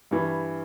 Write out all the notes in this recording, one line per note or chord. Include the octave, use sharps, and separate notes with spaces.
G2 E3